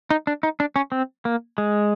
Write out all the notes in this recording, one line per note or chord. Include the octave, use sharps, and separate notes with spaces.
D#4
D4
D#4
D4
C#4
C4
A#3
G#3